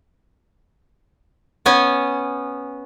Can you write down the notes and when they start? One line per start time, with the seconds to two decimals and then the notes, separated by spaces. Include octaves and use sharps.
1.66 B3 C#4 G#5